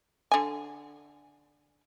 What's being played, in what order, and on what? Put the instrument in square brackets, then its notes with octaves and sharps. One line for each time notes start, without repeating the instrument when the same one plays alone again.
[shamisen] D3 G#5